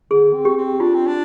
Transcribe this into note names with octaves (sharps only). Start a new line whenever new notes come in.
D3 G#4
C4
G4
C4
D4 F4
C4
D4